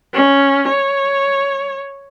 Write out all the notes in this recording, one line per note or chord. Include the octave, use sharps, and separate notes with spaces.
C#4
C#5